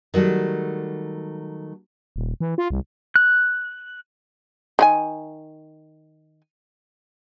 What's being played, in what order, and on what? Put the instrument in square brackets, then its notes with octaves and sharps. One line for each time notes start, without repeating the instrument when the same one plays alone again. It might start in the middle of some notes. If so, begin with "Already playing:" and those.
[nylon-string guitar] D#3 F#3 G3 A3
[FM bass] D#1
E3
F4
C2
[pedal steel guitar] F#6
[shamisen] D#3 F4 G#5